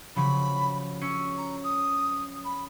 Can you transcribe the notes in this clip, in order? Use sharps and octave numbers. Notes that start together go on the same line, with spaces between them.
C#3 F3 F#3 B5
C#4 E6 C#7
A#5
D#6
B5